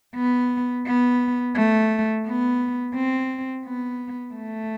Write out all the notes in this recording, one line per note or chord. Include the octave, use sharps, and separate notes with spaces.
B3
B3
A3
B3
C4
B3
A3